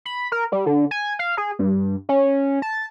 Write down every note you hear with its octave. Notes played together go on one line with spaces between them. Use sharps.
B5
A#4
G3
D3
G#5
F5
G#4
G2
C#4
A5